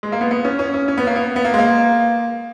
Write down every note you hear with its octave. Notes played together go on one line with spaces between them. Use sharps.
G#3
A#3
B3
B3
C#4
C#4
C#4
C#4
B3
A#3
B3
B3
A#3
G#3
A#3